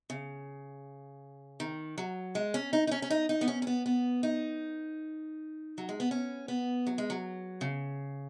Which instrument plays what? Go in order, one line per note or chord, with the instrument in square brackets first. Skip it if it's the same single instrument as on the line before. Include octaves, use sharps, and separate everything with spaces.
[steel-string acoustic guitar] C#3
D#3
F#3
G#3
C#4
D#4
D#4
C#4
C#4
D#4
D#4
B3
C#4
C#4
B3
B3
D#4
F#3
G#3
B3
C#4
B3
F#3
G#3
F#3
C#3